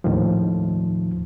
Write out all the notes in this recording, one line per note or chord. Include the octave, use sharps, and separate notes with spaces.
D#2 A2 D#3 F3